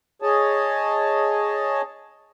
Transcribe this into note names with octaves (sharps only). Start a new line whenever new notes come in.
G#4 C#5 D#5 A5